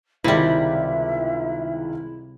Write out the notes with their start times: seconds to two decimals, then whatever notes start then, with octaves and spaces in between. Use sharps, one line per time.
0.24 C#2 C3 D#3 G3 G#3 E4 E5